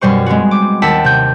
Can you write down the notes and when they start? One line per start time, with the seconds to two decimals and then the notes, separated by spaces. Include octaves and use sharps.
0.01 F#2 B2 G3 C5 C#6
0.26 G#3 B3 C4 F#4
0.51 D6
0.82 D#2 F#5 G5 A5 E6 B6
1.04 C3 G6